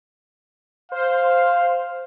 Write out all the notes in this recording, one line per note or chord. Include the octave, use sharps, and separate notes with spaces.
C5 F5